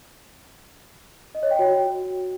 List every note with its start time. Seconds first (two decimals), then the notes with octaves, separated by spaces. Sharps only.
1.35 D#5
1.43 C#5
1.51 G5
1.59 F#4